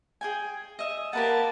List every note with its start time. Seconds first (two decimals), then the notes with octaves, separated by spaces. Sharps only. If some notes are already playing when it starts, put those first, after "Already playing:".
0.21 G#4 G5 G#5
0.79 D#5 E5
1.13 A#3 G4 B4 F#5 A5